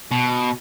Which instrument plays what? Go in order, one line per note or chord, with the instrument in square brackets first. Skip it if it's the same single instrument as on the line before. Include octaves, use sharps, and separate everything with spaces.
[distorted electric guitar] B2